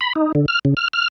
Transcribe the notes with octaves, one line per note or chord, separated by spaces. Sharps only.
B5
D#4
D3
F6
C#3
F6
F6